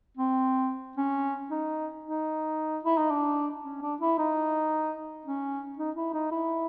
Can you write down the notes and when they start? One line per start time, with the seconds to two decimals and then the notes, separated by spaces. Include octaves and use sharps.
0.17 C4
0.97 C#4
1.50 D#4
2.04 D#4
2.85 E4
2.98 D#4
3.11 D4
3.64 C#4
3.82 D4
4.01 E4
4.18 D#4
5.25 C#4
5.78 D#4
5.96 E4
6.14 D#4
6.31 E4